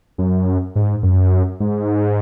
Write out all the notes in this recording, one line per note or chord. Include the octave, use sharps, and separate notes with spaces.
F#2
G#2
F#2
G#2